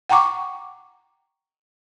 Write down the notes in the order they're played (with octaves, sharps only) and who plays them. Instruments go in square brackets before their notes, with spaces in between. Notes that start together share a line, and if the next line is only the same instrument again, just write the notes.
[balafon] F#5 G5 A#5 C#6 D6